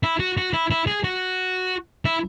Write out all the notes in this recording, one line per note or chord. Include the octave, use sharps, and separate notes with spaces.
E4
F#4
F#4
E4
E4
G#4
F#4
E4